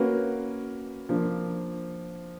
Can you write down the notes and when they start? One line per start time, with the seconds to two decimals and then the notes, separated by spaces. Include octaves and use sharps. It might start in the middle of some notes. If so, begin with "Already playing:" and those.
Already playing: A#3 C#4 F#4 B4
1.09 F3 A#3 D4